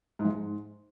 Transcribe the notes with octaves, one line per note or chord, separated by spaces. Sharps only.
G#2
G#3
G#2